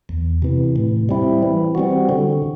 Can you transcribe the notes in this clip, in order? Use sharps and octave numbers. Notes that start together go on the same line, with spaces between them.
E2
C3 E3
A2
G3 C4 E4
E3
G3 C4 F#4
D3